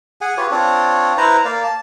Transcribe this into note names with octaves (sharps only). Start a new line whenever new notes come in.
G#4 F#5 G#5
F4 G4 B4 C#5
C4 D4 F4 C#5
E4 B4 C5 A#5
A#3 D5 F5
A5